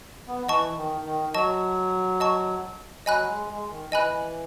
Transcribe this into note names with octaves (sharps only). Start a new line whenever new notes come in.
B3
E3 D#5 A5 C#6
D#3
D#3
F#3 D#5 A5 C#6
D#5 A5 C#6
F#3 D#5 G#5 B5 F#6
G#3
G#3
D#3
E3 D#5 G#5 B5 F#6